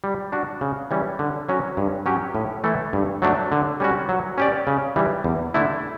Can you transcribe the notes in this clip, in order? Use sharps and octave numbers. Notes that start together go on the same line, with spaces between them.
G3
D4 F#4
C#3
E3 G3 C#4
D3
F#3 C#4 F#4
G2
F#3 C#4 G4
A2
E3 A3 E4 A4
G2
F#3 A3 D4
D3
G3 C#4 F#4
F#3
C#4 G4 D5
C#3
E3 G3
E2
D3 A3 E4